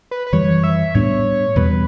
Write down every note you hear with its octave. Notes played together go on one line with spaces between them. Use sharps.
B4
B4
F#2 E3 G3 C#5
E5
A2 G3 B3 D4 C#5
E2 B2 G3 B4